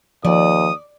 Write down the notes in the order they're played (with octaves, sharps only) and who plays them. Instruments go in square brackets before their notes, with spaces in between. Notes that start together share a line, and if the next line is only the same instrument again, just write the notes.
[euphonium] D#2 [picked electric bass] F3 [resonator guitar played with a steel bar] D5 [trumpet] D#6